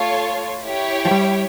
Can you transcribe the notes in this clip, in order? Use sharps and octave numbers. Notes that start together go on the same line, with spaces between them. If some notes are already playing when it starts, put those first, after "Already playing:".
Already playing: A3 F4 A4 C#5
E4 G4 C#5 G5
F3
G3